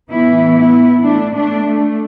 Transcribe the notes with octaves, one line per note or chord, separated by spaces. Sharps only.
A2 E3 B3 E4
B3 E4
A3 D4
A3 D4
A3